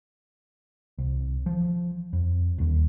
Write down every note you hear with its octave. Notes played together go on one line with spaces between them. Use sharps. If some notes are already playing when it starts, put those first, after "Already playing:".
C2
F3
F2
D#1 D#2